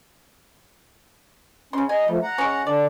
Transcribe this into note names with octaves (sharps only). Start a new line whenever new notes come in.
C#3 C#4 C6
D#5 G#5 A#5
F3 G3 A3
F#5 A#5
G#3 C#4
D3 D4 D5